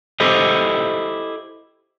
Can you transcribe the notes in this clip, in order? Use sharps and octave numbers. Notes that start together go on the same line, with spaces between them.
E4 G4 A4 C5 D#5